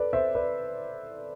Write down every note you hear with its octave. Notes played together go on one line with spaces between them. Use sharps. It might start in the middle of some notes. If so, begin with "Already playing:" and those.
Already playing: A4 B4 D5
C5 E5
B4 D5